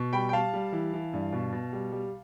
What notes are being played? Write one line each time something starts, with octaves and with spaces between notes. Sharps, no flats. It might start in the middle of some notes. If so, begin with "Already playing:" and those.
Already playing: B2
G3 G5 B5
G5
G3 F5 A5
G3
E3
E3
G2
B2
B2
G3
G3